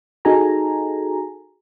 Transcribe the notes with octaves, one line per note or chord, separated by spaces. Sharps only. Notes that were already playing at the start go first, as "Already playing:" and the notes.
D#4 F#4 G#4 A4 G#5 A#5